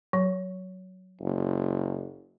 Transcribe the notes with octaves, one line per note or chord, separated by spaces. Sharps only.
F#3
F#1